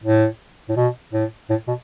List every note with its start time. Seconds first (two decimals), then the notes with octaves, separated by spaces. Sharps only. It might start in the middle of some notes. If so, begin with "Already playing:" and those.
0.04 A2
0.69 A2
0.76 B2
1.13 A2
1.50 A2
1.67 B2